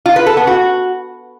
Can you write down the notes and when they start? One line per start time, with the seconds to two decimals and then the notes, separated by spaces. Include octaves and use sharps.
0.06 F4
0.16 B4
0.26 A4
0.37 B3
0.47 F#4